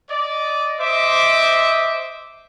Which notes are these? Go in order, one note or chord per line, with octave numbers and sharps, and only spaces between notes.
D5 D#5
C5 D#5 E5 D6